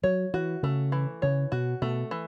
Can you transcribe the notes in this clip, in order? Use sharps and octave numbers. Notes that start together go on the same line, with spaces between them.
F#3 C#5
E3 F#4
C#3 A3
E3
C#3 C#5
B2 F#4
B2 A3
E3